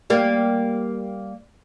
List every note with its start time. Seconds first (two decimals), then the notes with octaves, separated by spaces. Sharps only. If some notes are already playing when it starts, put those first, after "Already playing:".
0.10 G3 A#3